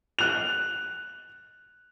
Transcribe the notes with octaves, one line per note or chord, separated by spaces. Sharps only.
F#6 F7